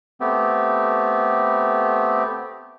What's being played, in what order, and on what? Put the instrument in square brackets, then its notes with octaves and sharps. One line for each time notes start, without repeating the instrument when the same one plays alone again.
[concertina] A3 B3 C4 G4